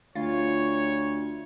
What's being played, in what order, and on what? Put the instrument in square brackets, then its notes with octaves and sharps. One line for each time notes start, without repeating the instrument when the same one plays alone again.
[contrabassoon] D2 [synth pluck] F4 [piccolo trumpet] C#5